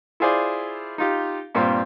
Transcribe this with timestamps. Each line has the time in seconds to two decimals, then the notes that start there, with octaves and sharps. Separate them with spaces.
0.20 E4 F4 G#4 C5 D5
0.98 D#4 F4 G4
1.55 G2 A#2 C4 F4